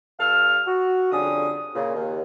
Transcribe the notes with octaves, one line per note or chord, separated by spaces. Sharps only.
G2 A4 F5 E6 F6
F#4
F2 D3 G3 C#4 G#4 D#6
A#2 C#3
D#2